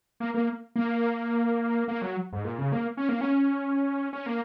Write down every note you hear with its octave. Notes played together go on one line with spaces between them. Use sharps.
A#3
A#3
A#3
A#3
F#3
G#2
A#2
C#3
A#3
C#4
A#3
C#4
C#4
A#3